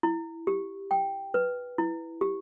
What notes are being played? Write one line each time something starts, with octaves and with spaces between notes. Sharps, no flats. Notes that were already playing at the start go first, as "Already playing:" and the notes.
E4
G4
G5
B4
E4
G4